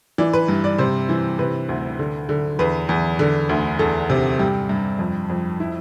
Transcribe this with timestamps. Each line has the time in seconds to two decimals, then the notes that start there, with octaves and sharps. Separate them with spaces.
0.18 E3 D5
0.33 B4
0.48 G2
0.64 D5
0.78 C3 C5
1.09 E3
1.39 C3 B4
1.69 D2
1.99 D3
2.29 D3
2.59 E2 B4
2.89 E2
3.19 D3
3.49 D2
3.79 E2 A4
4.10 C3
4.39 G2 G4
4.69 G2
4.99 F2
5.30 F2
5.60 E4